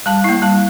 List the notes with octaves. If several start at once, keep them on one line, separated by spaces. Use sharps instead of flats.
G3 A5
A#3 E4
G3 A5